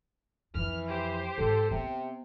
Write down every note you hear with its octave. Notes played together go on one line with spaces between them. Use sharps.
F2 E3 F6
G4 C5
G#2 A4
C3 B3